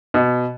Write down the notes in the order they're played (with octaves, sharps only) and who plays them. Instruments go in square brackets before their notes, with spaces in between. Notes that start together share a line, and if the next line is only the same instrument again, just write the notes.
[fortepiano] B2